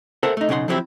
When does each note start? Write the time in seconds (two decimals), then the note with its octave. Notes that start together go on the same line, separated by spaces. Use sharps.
0.23 A4 A#4 C5 E5 F#5 A5
0.37 A3 D#4
0.49 B1 C#3 D#4 A#4 F#5 C6
0.68 F3 F#3 C4 E4 F4 G4